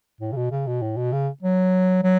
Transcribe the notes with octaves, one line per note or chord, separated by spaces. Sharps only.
A2
C#3
B2
C#3
B2
A2
B2
C#3
F#3
F#3